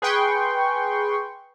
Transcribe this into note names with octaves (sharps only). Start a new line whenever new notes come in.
G#4 B4 G5 C6 C#6